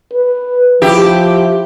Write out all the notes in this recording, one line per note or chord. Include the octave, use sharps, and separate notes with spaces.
B4
F3 E4 G4